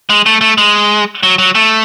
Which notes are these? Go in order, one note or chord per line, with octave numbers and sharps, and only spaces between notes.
G#3
A3
A3
G#3
F#3
F#3
A3